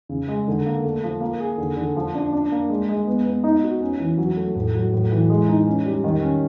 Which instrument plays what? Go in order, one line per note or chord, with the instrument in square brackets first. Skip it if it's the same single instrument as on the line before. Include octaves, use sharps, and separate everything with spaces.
[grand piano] C#3
G#3
D3
A#3
A3
F3
A#3
G#4
D3
D3
F3
D4
D4
A#3
G#3
G#3
B3
B3
D#4
F#4
C#4
E3
F#3
A3
A2
F#3
A2
E3
G#3
D#4
C#4
G3
D#3
C#4